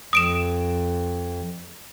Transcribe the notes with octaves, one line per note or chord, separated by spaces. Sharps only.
F2 D#6 D7 E7